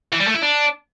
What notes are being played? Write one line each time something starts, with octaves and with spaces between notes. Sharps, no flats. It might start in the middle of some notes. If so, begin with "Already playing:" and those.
E3
G3
A3
E4
D4